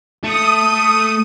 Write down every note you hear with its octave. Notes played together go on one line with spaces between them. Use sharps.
A3 D#6